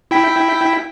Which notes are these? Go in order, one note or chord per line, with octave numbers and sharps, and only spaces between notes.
E4 G5 B6